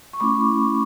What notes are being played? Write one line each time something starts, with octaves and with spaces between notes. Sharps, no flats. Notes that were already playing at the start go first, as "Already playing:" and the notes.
C#6
A3 C#4 E4 B5 D6